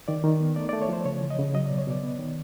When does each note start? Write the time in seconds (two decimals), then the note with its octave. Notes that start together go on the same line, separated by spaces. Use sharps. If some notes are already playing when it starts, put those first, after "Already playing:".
0.08 D#3 D5
0.24 D#3
0.41 B3
0.56 A3 D5
0.69 D5
0.73 A3
0.82 C#5
0.89 F3 C5
1.05 C#3 C#5
1.21 E3
1.30 D#5
1.38 C#3
1.54 F#3 D#5
1.66 B2 D5
1.78 C#5
1.87 B2 D5
2.03 B3
2.19 D#3